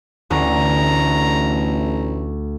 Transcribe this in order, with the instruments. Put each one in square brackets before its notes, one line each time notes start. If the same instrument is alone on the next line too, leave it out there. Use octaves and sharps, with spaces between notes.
[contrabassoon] A1 [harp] D2 [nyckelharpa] A#5